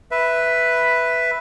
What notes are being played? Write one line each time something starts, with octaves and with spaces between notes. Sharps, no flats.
B4 E5